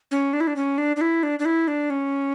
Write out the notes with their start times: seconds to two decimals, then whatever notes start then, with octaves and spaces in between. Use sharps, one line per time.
0.11 C#4
0.33 D4
0.40 E4
0.47 D4
0.56 C#4
0.78 D4
0.96 D4
1.01 E4
1.23 D4
1.39 D4
1.45 E4
1.68 D4
1.90 C#4